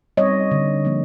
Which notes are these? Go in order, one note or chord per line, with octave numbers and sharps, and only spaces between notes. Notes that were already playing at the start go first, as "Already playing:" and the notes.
G3 C4 C#5 D#5
D3
F3 A#3